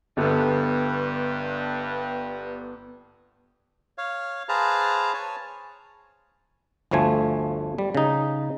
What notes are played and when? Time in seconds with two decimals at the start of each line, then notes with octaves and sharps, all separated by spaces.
0.17 G1 G2 B3 A4
3.98 C#5 F5
4.49 G#4 B4 C5 F5 A5 A#5
5.14 C#5 G#5 A5
6.91 G1 D2 F3 A3 G#5
7.78 G3
7.95 C#3 D#4